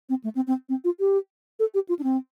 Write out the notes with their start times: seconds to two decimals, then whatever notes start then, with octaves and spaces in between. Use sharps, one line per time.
0.09 C4
0.24 A3
0.35 C4
0.47 C4
0.69 C4
0.84 F4
1.00 G4
1.59 A4
1.74 G4
1.89 F4
1.99 D4
2.03 C4